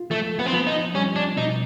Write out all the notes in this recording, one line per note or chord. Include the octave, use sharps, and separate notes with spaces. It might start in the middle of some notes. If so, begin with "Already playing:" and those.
Already playing: F4
F3 A3
B3
C4
F3 B3
D#4
G3 C#4
D4
B2 D#4